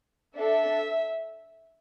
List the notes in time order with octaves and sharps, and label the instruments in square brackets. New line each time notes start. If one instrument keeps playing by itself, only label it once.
[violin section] D4 A4 E5